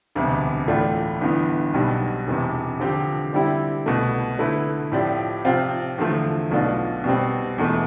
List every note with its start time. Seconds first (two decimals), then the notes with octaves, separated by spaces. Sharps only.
0.15 E1 D2 C3 G3 B3
0.68 A2 E3 A3 D4 F4
1.21 G1 G2 E3 B3
1.74 B1 B2 G3 C4
2.27 E1 E2 C3
2.80 D3 F3 C4 G4
3.33 D3 G3 C4 E4 G4
3.86 C2 B2 A3
4.38 D3 A3 E4 B4
4.92 A2 F3 C4 G4 D5
5.45 C3 F3 C4 F4
5.98 E2 D3 F3 A3
6.51 B1 B2 A3 D4 F4
7.04 B2 G3 C4
7.57 E1 E2 B2 A3